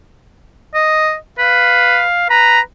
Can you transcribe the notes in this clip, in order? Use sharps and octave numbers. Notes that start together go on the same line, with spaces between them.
D#5
B4 F5
B4 A#5